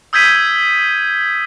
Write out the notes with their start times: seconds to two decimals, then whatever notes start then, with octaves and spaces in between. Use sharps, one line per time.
0.13 D#6 E6 G6 G#6 B6 D#7